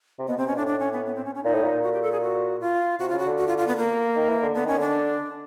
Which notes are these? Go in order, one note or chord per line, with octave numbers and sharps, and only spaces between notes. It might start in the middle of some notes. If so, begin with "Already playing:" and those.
C3
B2 B3
C3 C4
B2 C#4
A2 D4
D4
C#4
B3
B3
C4
C#4
C#4
A#2 D#4
A2
A#2
F#4
G4
A4
G#4
F#4
F4
C3 F#4
C#3 F4
F#4
D3
F#4
F4
F4
B3
A#3
D#3
E3
D3
D3 B3
D#3 C#4
D3 D4